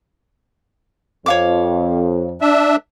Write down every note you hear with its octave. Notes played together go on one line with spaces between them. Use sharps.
F2 C#5 F5 D6
D4 E5